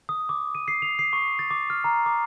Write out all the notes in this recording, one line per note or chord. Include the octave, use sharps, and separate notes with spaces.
D#6
D6
D#7
C7
F7
C7
C#6
A6
D6
F6
A#5
D6